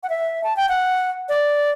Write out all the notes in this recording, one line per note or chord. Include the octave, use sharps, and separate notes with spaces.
F#5
E5
A5
G5
F#5
D5